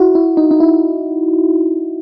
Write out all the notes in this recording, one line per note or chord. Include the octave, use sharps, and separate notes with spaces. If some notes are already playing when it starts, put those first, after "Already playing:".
Already playing: E4 F#4
E4
D#4
D#4
E4